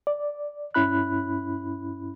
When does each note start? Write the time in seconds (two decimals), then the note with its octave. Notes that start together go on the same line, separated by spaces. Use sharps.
0.07 D5
0.74 G2 C#4 E4 B5 F#6